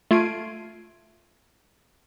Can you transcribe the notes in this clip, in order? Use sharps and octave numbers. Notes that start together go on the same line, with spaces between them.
A3 F4 G#6 C7 D7 D#7